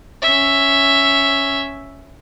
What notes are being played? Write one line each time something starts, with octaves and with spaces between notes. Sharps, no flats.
C#4 E5